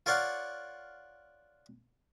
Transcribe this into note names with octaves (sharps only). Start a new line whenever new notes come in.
F4 A#4 C#5 D5 F5 F#5